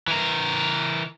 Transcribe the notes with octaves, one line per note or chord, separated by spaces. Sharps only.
E3 A#4